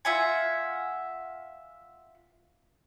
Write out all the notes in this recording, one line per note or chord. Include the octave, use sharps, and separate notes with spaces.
F4 E5 F#5 G#5